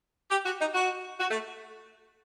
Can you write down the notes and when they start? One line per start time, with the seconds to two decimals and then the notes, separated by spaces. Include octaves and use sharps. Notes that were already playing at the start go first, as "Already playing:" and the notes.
0.30 G4
0.45 F#4
0.60 D#4
0.74 F#4
1.20 F#4
1.31 A3